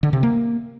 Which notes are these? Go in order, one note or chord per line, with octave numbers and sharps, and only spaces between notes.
D3
C3
A#3